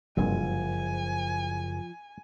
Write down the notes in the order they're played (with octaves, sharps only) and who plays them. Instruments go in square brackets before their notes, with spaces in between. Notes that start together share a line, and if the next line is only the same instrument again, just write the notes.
[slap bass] F#1 [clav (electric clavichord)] C2 G2 A#2 [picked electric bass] F3 [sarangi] G#5